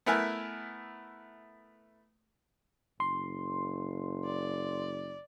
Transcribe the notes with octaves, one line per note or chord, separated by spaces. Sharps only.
A3 B3 E4 A#4 B4 G#5
F#1 C6
D5